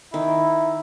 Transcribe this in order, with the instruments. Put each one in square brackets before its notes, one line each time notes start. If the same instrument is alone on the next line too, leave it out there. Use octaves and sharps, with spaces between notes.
[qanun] D#3 [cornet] E4